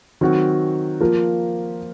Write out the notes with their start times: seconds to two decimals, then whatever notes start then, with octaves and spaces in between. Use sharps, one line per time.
0.21 D#3 F#3 C4 F#4
1.01 F3 A#3 F4 A#4